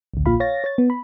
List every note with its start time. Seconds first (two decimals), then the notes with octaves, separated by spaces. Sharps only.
0.14 A1 D2
0.26 A#1 A#2 F4 F5 B5
0.40 C#5 F5 A6 A#6
0.64 C#5 A6
0.78 B3
0.90 B5